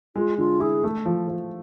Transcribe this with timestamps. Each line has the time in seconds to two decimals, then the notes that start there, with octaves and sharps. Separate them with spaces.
0.16 G#3 F4
0.38 D3 F4
0.60 E4 G#4
0.84 A3
1.06 F3
1.28 F3